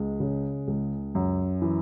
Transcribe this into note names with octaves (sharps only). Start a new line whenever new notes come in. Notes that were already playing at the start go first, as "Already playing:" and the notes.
Already playing: C#2 G#3
C#3
C#2
F#2
E3